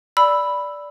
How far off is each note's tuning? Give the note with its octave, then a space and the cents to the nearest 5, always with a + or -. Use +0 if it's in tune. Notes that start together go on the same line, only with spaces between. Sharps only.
D5 -10 B5 +0 E6 +0